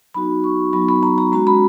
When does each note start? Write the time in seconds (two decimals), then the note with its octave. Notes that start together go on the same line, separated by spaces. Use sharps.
0.14 F#3 B3 D#4 F#4 B5
0.44 C#6
0.73 F#3 B3 D#4 F#4 B5
0.89 B5
1.03 A#5
1.18 A#5
1.32 G#3 C#4 F#4 A#5
1.47 B5